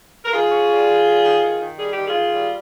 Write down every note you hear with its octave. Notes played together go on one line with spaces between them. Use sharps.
A#4
D#3 F4 G#4
C#4
G3
D#3
G3
D#3
D#3
D#3
G3 G#4
D#3 G4
F4 G#4
D#3
G3